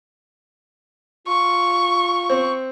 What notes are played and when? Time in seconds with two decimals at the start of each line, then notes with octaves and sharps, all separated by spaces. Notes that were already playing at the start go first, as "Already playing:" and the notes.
1.27 F4 C#6
2.30 C4